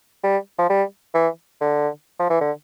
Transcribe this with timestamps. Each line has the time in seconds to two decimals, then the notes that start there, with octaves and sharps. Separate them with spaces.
0.24 G3
0.59 F3
0.69 G3
1.14 E3
1.61 D3
2.20 F3
2.30 E3
2.41 D3